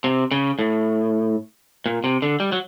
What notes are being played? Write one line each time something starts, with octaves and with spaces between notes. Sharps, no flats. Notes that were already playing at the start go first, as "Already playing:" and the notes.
C3
C#3
A2
A#2
C3
D3
G3
F#3